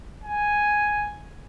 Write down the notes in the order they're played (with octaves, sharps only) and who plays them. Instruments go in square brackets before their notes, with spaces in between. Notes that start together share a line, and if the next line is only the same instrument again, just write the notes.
[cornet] G#5